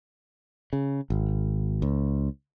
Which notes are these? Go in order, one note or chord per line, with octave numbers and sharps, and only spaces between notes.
C#3
G#1
C#2